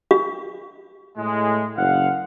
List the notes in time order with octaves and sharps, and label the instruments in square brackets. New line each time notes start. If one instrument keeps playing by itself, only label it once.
[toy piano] G4
[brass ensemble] A2 G#3
F#1 F5 F#5